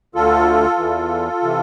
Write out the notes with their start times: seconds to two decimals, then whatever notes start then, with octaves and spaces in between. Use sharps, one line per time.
0.15 D2 D3 F4 A4
0.78 E2 E3
1.43 C3 E3